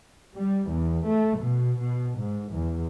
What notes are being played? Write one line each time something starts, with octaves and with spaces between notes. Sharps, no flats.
G3
E2
A3
B2
B2
G#2
E2